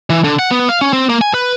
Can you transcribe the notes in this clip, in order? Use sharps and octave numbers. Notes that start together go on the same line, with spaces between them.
E3
D3
F#5
B3
F5
C#4
C4
A#3
G#5
B4